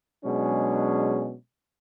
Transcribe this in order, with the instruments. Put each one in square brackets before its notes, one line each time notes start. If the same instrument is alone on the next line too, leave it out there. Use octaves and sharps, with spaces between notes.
[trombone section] B2 F#3 G#3 C#4 D4 G#4